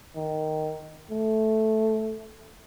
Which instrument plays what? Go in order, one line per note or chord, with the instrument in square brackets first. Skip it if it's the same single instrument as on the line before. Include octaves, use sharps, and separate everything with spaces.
[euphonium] D#3
A3